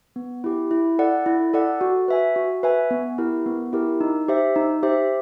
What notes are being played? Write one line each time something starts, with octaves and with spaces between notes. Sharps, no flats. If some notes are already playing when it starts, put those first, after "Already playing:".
B3
E4 G4
E4
A4 D5 F#5
E4
A4 D5 F#5
F#4
B4 E5 G#5
F#4
B4 E5 G#5
B3
E4 G4 A#4
B3
E4 G4 A#4
D#4
G4 C5 E5
D#4
G4 C5 E5